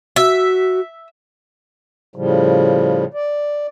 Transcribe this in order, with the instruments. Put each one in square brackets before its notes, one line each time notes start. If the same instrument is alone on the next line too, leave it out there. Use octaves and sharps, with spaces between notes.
[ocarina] F#4 [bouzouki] E5
[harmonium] A2 C#3 F3 G3
D5